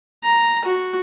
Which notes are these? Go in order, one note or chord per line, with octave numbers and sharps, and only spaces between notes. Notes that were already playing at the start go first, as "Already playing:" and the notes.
A#5
F#4